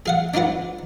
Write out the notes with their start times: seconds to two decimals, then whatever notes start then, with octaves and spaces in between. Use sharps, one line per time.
0.06 G#4 F5 F#5
0.34 D4 D#4 F4 B4 F#5